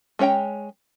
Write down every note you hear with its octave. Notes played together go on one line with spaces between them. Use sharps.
G#3 C#4 C#5 G5 A#5